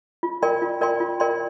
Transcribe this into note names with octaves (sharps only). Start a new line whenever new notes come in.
F4
A#4 D5 G5 C6
F4
A#4 D5 G5 C6
F4
A#4 D5 G5 C6